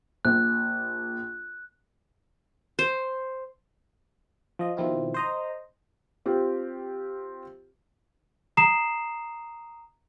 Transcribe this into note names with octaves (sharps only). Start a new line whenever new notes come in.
A#1 F#6
C5
F3 D#5
B2 D#3 F3 C4 E4 F4
C5 D#5 A#5
C4 F4 G4
A#5 D#6 C7 E7